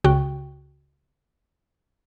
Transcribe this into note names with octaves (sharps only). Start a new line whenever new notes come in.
C#2 C#3 F#4 G5